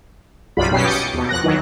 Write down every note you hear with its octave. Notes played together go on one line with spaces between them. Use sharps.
B1 F#2 C3 G3 F4 B5
B2 F#3 C#4 G4 B6 C7
D6 D#6 G6 A6 C#7
D#2 B2
F2 F#6 A#6
D#3 E3 F#3